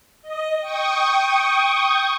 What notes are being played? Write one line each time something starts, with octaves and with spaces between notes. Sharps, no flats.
D#5
G5 C#6 D#6